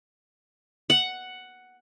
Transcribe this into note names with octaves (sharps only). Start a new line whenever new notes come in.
F#5